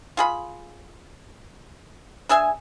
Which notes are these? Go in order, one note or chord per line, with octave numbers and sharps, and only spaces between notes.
F4 G#4 B5
D4 G#4 E5 G#5